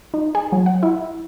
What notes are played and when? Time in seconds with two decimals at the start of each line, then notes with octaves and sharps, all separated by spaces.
0.14 D#4
0.35 G#4
0.52 F#3
0.66 F#5
0.83 E4